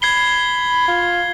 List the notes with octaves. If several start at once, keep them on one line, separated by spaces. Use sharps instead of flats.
B5 G#6 C7 G7
F4